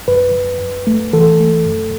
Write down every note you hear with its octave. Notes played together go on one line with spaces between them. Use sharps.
F#2 B4
F#2
F#2
A3
E3 A4
A3
F#2